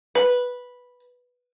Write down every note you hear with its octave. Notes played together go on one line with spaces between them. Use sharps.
B4